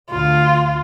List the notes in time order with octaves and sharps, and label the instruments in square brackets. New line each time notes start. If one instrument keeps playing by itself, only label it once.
[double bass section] D2 [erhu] F4